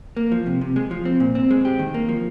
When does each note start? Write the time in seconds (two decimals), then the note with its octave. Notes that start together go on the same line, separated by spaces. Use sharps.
0.17 A#3
0.32 F3
0.46 C3
0.61 C3
0.76 G#3
0.91 F3
1.05 C4
1.20 A#2
1.35 C4
1.51 G#3
1.65 G4
1.79 D#3
1.94 A#3
2.09 F3